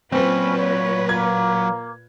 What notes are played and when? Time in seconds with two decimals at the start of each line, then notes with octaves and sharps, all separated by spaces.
0.12 A#2 F#3 C4 C#4 B4 B5
0.58 C#5
1.09 A#3 G#6